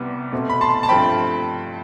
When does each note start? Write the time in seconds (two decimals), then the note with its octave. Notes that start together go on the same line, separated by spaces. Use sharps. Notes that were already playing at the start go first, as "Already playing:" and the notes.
Already playing: C2 C3 G3 B3
0.32 B2 A3 C4
0.50 B5
0.61 A5 C6
0.83 A5
0.89 G2 F3 A3 C4 G5 B5